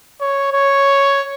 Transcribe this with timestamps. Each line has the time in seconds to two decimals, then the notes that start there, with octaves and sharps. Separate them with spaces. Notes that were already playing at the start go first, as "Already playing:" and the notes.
0.21 C#5
0.53 C#5